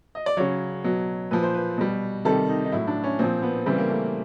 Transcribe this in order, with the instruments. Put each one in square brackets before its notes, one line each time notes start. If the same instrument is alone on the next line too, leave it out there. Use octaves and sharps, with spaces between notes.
[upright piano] D#5
D5
C#3 F#3 C#5
B2 F#3
A#2 F3 B4
C5
B4
B2 G3
C3 D#3 G3 A4
D#4
D#4
A2 F#3 E4
D4
C#4
A#2 F3 C4
B3
C#3 E3 G3 C4
A#3
A3